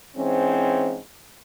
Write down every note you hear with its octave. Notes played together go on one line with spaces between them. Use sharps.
G#2 E3 C4 C#4